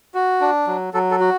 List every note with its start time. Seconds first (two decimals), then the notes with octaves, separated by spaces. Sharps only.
0.14 F#4
0.41 D4
0.67 F#3
0.94 F#3 A4
1.11 A4
1.20 F#4